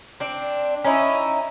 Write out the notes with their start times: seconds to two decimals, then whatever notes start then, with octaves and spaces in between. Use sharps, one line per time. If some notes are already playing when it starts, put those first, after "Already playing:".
0.20 C4 D4
0.84 C#4 D#4 E4